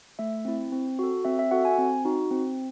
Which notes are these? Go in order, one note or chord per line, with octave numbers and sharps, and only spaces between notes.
A3 E5
C4 E4
C4
F#4 A4
C4 E5
E5
F#4 A4 F#5
G#5
C4
D#4 F#4
C4